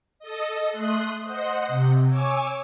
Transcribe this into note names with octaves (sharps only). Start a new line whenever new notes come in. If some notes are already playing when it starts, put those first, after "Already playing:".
A4 D#5
A3 C6 D#6 F#6
C5 D#5 F#5
C3
C#5 G#5 D6 E6